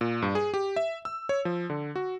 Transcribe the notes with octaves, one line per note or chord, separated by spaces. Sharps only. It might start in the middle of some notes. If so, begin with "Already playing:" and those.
A#2
G2
G#4
G4
E5
E6
C#5
F3
D3
F#4